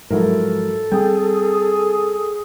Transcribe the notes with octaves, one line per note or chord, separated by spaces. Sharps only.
G#2 F3 F#3 E4 A4 A#4
G3 C4 G#4 G5